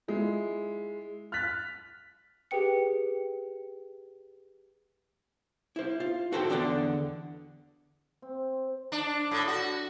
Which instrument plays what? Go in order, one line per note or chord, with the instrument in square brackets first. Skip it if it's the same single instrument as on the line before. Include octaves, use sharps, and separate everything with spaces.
[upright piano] G#3 E4 F4
F6 F#6 A6 B6
[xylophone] G4 G#4 B4 G5 C#7
[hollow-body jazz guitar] E4 C5
F4
F#4 A4 C5 E5 F#5 G5
E2 D3 D4 D5 F#5
[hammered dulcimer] C4
[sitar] D4
A2
F#4